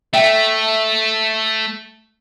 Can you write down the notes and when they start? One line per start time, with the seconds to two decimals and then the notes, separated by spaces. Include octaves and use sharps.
0.13 A3 E5 G5